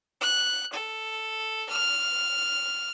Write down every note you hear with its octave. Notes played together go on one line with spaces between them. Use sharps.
F#6
A4
F6